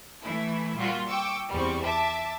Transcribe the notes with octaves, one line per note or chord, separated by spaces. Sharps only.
E3 A3 E4
A#2 G3 F4 F#4
G5 C#6 D6 E6
E2 G3 C4 C#6
E5 A5 D6